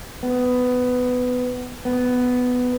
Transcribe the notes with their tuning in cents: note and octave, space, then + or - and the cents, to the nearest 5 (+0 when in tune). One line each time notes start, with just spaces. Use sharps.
B3 +15
B3 +10